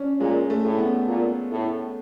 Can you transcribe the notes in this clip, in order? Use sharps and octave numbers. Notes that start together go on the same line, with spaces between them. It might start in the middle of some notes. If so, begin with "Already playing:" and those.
Already playing: C#4 D4
A#2 G#3
A3
A2
B3
A#2
A2